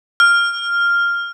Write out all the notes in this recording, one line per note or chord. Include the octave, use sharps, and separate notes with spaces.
F6